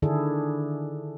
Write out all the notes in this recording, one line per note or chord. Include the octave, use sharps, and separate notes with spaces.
D3 D#3 D4 E4 G#4 A4